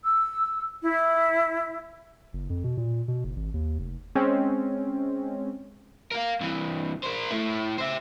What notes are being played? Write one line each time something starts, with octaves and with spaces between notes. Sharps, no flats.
E6
E4
F#1
F2
B2
A#2
B2
F#1
G#1
D#2
F1
G#3 C4 C#4
A#4 F5
C2 E3
A#4 C5
A3 E4
C5 E5